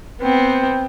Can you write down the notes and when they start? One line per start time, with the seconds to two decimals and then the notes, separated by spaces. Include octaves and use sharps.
0.21 B3 C4